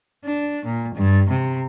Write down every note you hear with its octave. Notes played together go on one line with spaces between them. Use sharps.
D4
A#2
G2
C3